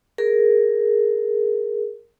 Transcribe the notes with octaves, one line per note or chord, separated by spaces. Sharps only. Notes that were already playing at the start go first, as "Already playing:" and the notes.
G#4 A#4